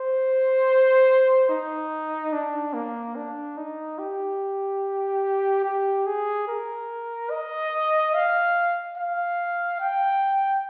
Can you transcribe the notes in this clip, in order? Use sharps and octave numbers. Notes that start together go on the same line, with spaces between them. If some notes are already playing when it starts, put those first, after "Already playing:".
Already playing: C5
D#4
D4
A#3
D4
D#4
G4
G4
G#4
A#4
D#5
F5
F5
G5